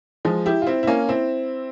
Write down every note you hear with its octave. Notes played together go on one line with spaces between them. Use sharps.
F3 G#3
E4 G4
F4
C4 E4
E4
A#3 C#4
C4 E4